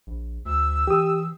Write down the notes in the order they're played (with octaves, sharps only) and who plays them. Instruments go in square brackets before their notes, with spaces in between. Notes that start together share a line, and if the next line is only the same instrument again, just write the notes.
[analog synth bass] A#1
[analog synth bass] D2 [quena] E6
[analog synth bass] E3 [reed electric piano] G4 D#6